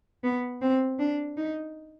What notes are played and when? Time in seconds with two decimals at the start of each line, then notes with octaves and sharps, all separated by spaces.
0.24 B3
0.62 C4
0.99 D4
1.37 D#4